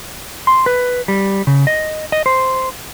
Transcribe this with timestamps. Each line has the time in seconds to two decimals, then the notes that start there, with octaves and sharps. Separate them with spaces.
0.47 C6
0.66 B4
1.08 G3
1.47 C#3
1.67 D#5
2.12 D#5
2.26 C5